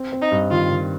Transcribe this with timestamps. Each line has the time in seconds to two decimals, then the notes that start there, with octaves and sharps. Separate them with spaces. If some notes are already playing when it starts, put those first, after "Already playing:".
Already playing: C4
0.12 C4
0.22 D#4
0.32 G2
0.51 D#3 F4
0.71 D#3